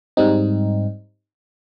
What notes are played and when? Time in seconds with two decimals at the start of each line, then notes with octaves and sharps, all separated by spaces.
0.17 G#2 G3 C4 D#4